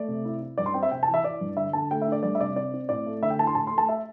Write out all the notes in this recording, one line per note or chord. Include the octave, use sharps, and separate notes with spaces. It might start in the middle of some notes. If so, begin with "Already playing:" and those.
Already playing: A3 D5
C3
E4
E4
G2 D5
C6
C4 G5
E5
C3 G5
A5
E3
E5
E4 D5
G2
D3 E5
D3 A5
A3 G5
E5
D4
D5
G3 D5
E5
C3 D5
C4 D5
C4
A2 D5
A3
D3 E5
G5
E4 A5
C6
A2 A5
C6
A3
A5
E5